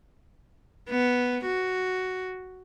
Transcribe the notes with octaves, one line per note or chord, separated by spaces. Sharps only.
B3
F#4